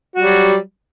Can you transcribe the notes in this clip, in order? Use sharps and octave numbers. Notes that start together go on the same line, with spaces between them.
F#3 G3 F#4